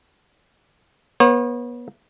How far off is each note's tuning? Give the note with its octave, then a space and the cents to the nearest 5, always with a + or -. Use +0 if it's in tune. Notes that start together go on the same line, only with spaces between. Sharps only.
B3 -30 C#5 -45